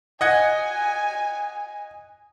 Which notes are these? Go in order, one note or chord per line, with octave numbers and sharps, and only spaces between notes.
D#5 F#5 G#5 G#6